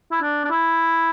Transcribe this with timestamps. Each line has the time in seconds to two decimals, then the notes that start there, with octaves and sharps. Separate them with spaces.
0.12 E4
0.22 D4
0.45 D4
0.51 E4